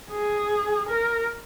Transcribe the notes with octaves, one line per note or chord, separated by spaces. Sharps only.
G#4
A#4